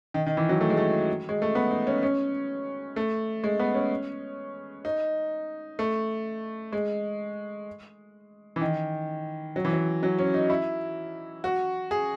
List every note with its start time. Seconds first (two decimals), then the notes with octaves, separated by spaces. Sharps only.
0.14 D#3
0.27 D#3
0.37 E3
0.49 F#3
0.61 A3
0.70 G#3
0.77 A3
1.29 G#3
1.42 A3
1.55 B3
1.71 D#4
1.87 C#4
2.03 C#4
2.96 A3
3.44 G#3
3.59 B3
3.74 C#4
4.85 D#4
5.79 A3
6.73 G#3
8.56 E3
8.61 D#3
9.56 F#3
9.65 E3
9.73 F#3
10.03 F#3
10.18 C#4
10.34 D#4
10.50 E4
11.44 F#4
11.91 G#4